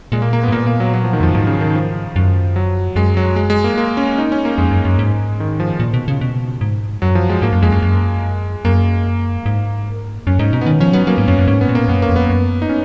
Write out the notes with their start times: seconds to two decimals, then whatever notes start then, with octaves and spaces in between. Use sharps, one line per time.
0.12 A#2 G#3
0.22 A#3
0.33 A#3
0.43 B3
0.48 G#2
0.52 A#2 A#3
0.67 A#3
0.80 F#3
0.94 F#3
1.04 F3
1.13 D#3
1.21 F2 F3
1.28 F#2
1.35 G#2 D#3
1.47 C#3
1.61 D#3
1.75 F3
2.16 F#2
2.56 F#3
2.96 F#2 G#3
3.17 F#3
3.36 G#3
3.50 G#3
3.64 A#3
3.78 A#3
3.97 C#4
4.18 D#4
4.32 C#4
4.45 A#3
4.58 F2 G#3
4.71 F#2
4.85 F#2
4.99 G#2
5.40 D#3
5.60 F3
5.80 A#2
5.94 B2
6.08 C#3
6.21 B2
6.61 G#2
7.02 F#2 F#3
7.15 F3
7.30 G#3
7.42 G#2 A#3
7.53 F#2
7.62 F2 G#3
7.72 F#2
7.82 F#2
8.65 F#2 A#3
9.46 G#2
10.27 F#2 C#4
10.39 G#2 D#4
10.53 B2 D#4
10.61 B3
10.66 D#3 C#4
10.80 F3 C#4
10.93 F#3 B3
11.07 F#3 A#3
11.18 G#2
11.28 F#2 C#4
11.38 F#2
11.48 G#2 C#4
11.61 B3
11.69 A#2
11.75 A#3
11.88 F#2 B3
12.02 A#3
12.09 F2
12.16 B3
12.30 F#2
12.62 D#4
12.69 C#4